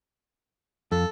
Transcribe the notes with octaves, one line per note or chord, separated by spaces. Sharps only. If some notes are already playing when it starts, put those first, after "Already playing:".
F2 A4